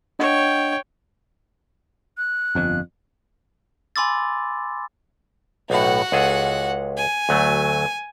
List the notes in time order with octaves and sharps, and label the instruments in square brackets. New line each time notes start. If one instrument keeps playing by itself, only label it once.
[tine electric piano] D4 D#5 F#5 [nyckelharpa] C#5 G5
[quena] F#6
[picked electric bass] G1 F2
[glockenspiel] G#5 B5 C6 D6 E6 A6
[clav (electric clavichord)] B1 A2 [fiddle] F#4 F#5
[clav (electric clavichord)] C#2 G#4 A4
[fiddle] G#5
[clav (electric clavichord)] D2 F#3 A3